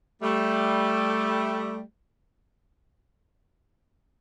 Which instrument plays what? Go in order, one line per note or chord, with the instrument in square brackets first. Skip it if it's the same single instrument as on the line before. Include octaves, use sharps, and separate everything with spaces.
[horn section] G3 A3